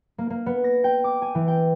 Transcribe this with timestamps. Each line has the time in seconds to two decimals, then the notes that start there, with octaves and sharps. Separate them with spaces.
0.18 A#3
0.30 A#3
0.46 B3
0.64 A#6
0.84 G5
1.04 D6
1.22 G#5
1.35 E3
1.48 G5